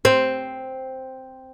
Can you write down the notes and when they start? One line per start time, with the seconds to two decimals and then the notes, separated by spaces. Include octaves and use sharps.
0.05 C4